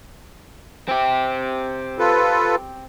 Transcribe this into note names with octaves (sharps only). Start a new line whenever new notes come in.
C4 G4
F4 A4 B4